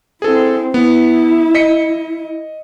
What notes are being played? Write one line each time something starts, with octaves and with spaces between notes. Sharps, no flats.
C4 E4 G#4 A4
B3 E4
D#5 B6 C#7